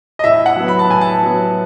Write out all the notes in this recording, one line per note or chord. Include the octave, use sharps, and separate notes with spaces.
D#5
A2 E5
F#5
F#3 B3
B5
A5
A2 G#5
A5
F#3 B3